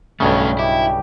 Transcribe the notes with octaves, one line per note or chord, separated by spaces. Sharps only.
B1 G2 C#3 A3 C#4
E4 G4